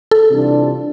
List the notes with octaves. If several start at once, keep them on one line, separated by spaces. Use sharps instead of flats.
A4
C3 E3 G3 D4 F4